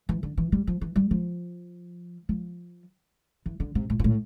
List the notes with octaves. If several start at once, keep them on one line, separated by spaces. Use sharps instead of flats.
E3
D3
E3
G3
F3
E3
G3
F3
F3
E3
D3
C3
A2
A#2
A2